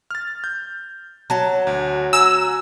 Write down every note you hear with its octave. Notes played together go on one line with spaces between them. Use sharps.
F6 A6
G6
F#3 A5
D2
F#5 G#5 A#5 E6